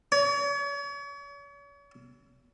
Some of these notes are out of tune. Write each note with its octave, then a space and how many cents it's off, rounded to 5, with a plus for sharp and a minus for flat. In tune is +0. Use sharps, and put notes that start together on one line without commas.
C#5 +40